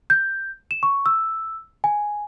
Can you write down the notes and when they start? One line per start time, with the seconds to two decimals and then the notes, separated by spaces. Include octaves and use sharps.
0.10 G6
0.71 E7
0.83 C#6
1.06 E6
1.84 G#5